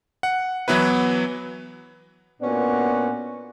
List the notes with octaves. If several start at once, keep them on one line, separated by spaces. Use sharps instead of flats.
F#5
E3 F#3 B3 E4 B4
A#2 B3 C#4 D4 F#4